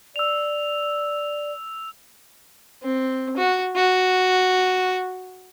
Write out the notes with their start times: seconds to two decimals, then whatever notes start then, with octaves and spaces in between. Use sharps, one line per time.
0.16 D5 E6 F7
2.83 C4
3.37 F#4
3.75 F#4